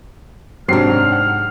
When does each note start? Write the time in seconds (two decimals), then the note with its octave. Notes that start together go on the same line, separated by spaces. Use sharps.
0.68 G#2 C3 F#3 C4 D4 F6 C7
1.12 F#5